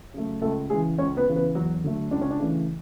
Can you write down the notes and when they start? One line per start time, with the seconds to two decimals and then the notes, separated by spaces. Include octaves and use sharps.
0.14 C#3 F#3 A3
0.42 C#2 A3 A4
0.70 C#3 E3 G#3 G#4
0.98 C#2 C#4 C#5
1.17 B3 B4
1.27 C#3 E3
1.36 B3 B4
1.55 E2 F#3 F#4
1.84 D3 F#3 A3
2.11 C#2 D4
2.21 C#4
2.31 D4
2.39 C#3 E3 A3